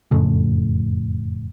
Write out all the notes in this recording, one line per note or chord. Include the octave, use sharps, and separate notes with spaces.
F#1 F2 A2 C#3